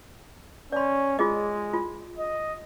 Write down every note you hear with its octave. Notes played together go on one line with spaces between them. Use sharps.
C#4 D5 C6
G#3 F4 G#4 D#5
F4
D#5